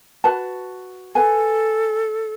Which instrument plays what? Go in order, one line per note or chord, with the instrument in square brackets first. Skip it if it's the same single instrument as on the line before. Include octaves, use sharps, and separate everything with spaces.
[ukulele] F#4 B4 A5
[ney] A4 [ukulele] B4 G#5